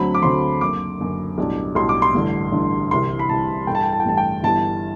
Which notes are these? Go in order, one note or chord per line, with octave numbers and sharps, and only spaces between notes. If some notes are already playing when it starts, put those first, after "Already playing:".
Already playing: D2 D3 F#3 C4 B5
D6
D2 D3 F#3 C4 C6
F#1 F#2 D3 D6
F#1 F#2 D3
B1 A2 G3 D4
B1 A2 G3 D4 C6
D6
C6
A1 G2 D3
A1 G2 D3
C2 C3 E3 C6
B5
C2 C3 E3 A5
A1 G2 E3 A3 G5
A5
G5
A5
G5
A1 G2 E3 A3 A5
G5
G1 G2 E3 G3 A5